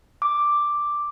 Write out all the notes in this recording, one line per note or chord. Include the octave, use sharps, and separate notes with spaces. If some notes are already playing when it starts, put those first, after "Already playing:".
D6